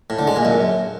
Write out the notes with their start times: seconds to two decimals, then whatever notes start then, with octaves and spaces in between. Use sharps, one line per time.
0.10 A2
0.19 D3
0.27 G#3
0.36 A#2
0.45 F#2